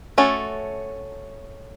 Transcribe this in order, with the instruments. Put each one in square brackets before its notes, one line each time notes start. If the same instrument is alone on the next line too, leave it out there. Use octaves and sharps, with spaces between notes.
[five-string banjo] A3 C#4 F#4 A4